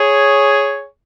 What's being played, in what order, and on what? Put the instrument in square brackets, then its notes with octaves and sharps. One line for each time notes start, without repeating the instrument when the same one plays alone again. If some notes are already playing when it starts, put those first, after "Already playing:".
Already playing: [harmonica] G#4 C#5